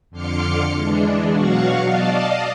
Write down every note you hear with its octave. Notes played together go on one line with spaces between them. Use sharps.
F2 D3 C6 D6 F6 C#7
E3 G#3 D4
B2 F#3 F#4 F5 F#5 C#6
D5 D#5 F5 A5